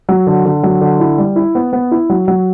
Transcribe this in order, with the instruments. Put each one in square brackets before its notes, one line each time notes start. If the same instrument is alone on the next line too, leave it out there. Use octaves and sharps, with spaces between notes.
[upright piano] F#3
D3
D3
F#3
D3
E4
G3
E4
B3
B3
E4
F#3
F#3